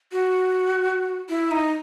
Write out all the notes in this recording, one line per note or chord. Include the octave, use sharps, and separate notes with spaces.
F#4
E4
D#4